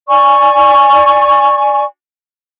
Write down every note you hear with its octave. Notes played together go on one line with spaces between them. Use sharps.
D5 G#5 C#6